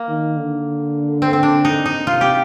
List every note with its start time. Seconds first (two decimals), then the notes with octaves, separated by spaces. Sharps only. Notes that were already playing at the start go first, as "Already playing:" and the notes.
Already playing: A#3
0.09 D#3
0.37 D3
1.22 C4
1.33 C4
1.43 D4
1.65 D#4
1.86 D#4
2.06 C3 F4
2.21 G4